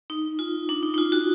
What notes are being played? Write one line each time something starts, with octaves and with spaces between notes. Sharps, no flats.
D#4
F4
D4
D#4
D#4
F4
F#4